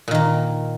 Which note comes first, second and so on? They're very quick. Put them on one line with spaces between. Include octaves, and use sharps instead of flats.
A#2 D#3 A#3